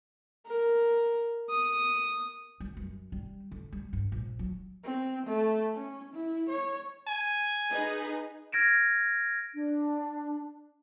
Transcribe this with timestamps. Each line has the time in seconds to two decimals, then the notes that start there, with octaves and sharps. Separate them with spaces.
0.47 A#4
1.50 D#6
2.60 G3
2.77 F#2
3.12 G3
3.51 D3
3.72 G3
3.93 G2
4.12 A#1
4.39 F#3
4.83 C4
5.26 A3
5.73 C#4
6.13 E4
6.49 C#5
7.07 G#5
7.70 D#4 G#4 B4
8.52 F6 G#6 A#6 D7 E7
9.54 D4